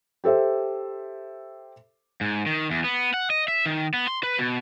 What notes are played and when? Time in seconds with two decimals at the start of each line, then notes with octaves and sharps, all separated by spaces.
0.24 G4 A4 C5 E5
2.21 G#2
2.46 D#3
2.71 E2
2.84 B3
3.14 F#5
3.30 D#5
3.48 E5
3.66 D#3
3.94 B3
4.07 C6
4.23 B4
4.39 B2